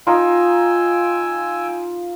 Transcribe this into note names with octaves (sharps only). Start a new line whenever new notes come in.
D#4 F4 G5 G#5 E6